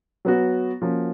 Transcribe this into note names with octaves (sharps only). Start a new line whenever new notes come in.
F#3 B3 F#4
F3 A#3 C#4 F#4